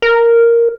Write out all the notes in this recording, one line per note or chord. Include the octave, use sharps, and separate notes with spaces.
A#4